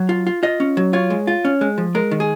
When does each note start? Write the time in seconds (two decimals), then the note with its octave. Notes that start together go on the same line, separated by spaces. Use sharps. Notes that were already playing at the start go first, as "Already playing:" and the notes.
Already playing: F#3
0.09 F4
0.27 F4
0.43 F4 D#5
0.60 C#4
0.77 F#3
0.93 F4 C#5
1.10 G#3
1.27 F4
1.45 C#4
1.61 G#3
1.78 F3
1.95 G#3 A#4
2.11 D#3
2.20 G#4